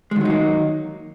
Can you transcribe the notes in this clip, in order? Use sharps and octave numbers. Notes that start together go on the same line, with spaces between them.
D#3 F#3 G#3 A#3 D#4